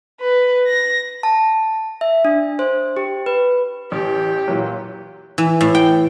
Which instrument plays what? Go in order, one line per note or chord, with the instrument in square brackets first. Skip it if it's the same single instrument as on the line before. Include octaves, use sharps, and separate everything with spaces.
[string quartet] B4
A#6
[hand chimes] A5
E5
D4
C5
G4
B4
[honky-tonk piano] A1 [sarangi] G4
[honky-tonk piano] A#2 E3 F#3
[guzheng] E3
A2
G5